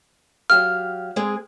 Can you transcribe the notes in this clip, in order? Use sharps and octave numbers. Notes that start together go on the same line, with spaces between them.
F#3 G4 F5 F6
G#3 C4 G#4